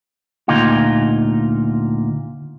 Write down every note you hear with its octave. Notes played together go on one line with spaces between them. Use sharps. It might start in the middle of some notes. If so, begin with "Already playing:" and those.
D2 A#2 D#4 F4